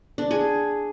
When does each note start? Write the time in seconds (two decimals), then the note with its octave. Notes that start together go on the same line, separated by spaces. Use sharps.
0.18 D4
0.31 G#4